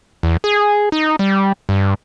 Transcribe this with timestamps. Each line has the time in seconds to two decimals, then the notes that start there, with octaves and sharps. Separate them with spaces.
0.23 E2
0.44 G#4
0.92 D#4
1.19 G3
1.69 G2